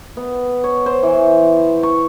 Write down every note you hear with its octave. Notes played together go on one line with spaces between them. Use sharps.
B3
C#5
C5
E3
C#6